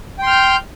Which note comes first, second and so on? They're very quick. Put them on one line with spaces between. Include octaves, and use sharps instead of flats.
G5 C6 F6 G6